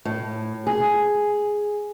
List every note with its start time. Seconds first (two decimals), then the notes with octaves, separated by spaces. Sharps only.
0.05 A2
0.67 G#4